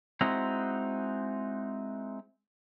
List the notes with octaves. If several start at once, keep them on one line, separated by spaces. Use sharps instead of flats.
G#3 C4 D#4 E4 F#4